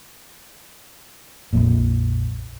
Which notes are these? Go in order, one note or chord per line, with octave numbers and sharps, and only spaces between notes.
A#1 F2 A#2